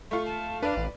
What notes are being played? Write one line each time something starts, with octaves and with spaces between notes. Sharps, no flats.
A3 F4 C#6
A5
D4 B4 D5 F5
A1